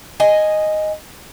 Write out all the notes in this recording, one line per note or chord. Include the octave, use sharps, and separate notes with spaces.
D#5 G#5